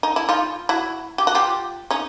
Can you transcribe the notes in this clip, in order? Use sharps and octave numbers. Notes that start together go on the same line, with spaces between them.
D#4
E4
D#4 F4
E4 F#4
G4
F#4
F4 G4
C#4 D#4